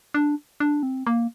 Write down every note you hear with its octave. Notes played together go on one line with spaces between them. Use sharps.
D4
D4
C4
A#3